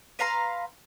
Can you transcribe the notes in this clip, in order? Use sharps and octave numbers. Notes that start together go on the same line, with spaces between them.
B4 F5 A#5 C6